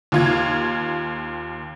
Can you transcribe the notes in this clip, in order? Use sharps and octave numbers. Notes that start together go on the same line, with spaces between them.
D#2 F4 G#6